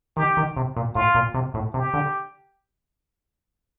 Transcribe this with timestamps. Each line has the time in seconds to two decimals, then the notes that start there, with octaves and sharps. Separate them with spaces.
0.17 D#3 G4
0.37 D#3
0.56 C3
0.76 A#2
0.95 A2 F4
1.15 A#2
1.34 C3
1.54 A2
1.74 C3 G4
1.94 D3